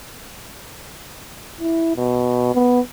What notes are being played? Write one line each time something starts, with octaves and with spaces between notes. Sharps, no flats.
E4
B2
B3